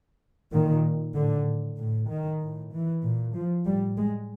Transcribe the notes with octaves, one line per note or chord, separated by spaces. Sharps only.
A#2 D#3
A2 D3
A2
D#3
A2
E3
A#2
F3
A2 G3
G#3